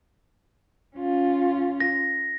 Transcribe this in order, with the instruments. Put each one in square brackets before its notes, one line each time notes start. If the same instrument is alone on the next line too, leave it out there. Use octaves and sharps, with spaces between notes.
[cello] C#4 F4
[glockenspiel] A#6